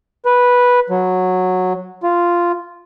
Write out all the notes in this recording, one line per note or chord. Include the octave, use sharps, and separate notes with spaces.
B4
F#3
F4